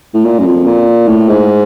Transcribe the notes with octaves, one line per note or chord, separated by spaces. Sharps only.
A2
A#2
F#2
F2
A#2
A2
G#2